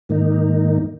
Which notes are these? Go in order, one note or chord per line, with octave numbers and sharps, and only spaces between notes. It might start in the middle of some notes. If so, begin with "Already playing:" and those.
G#2 D#3 A#3 D#4